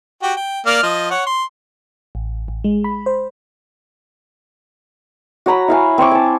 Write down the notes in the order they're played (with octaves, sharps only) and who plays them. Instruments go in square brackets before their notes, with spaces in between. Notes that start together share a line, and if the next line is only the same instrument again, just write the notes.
[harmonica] F#4 G4 G5
G5
A#3 D5 F6
F3 D#5
C#5 F#5
C6
[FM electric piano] A1
A1
G#3
B5
C5
[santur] F#4 C#5 A#5 B5
E4 F5 G#5
C4 G#5 C#6 D6
G#5 A5